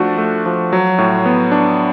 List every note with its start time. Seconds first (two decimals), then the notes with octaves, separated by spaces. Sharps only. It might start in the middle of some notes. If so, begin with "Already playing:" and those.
Already playing: F3 A3 D4 F#4
0.18 A3
0.46 F3
0.73 F#3
0.98 A2
1.26 B3
1.51 D4